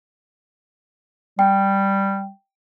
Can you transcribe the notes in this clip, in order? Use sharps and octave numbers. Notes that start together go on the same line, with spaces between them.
G3 G5